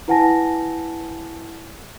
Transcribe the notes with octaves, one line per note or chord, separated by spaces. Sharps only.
E4 B4 F#5 G#5 A5 A#6